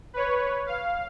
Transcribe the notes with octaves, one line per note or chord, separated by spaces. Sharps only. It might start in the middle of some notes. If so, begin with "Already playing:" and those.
B4 C#5
F5